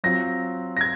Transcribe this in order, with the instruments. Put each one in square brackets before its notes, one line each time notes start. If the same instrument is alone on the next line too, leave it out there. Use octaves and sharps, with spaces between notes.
[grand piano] F#3 C4 F4 [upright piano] A#6
[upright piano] A#6
G#6